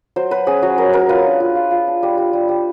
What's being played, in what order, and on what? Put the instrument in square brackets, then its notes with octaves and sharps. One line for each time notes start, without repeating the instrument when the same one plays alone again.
[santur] F#3 C5
F#3 B4
C#4 G#4
F#3 F#4
F#3 A#4
C#4 A#4
F4 B4
D4
F4
F4
F4
D4
G3
G3
G3
G3